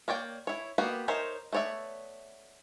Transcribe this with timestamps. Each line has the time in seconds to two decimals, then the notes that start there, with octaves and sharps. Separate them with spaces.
0.08 A#3 C#5 D5 G5
0.47 E4 C#5
0.78 A#3 B3 F#4 G4
1.08 D#4 A#4 C5 C#5 E5
1.53 A3 B3 C#5 D5 E5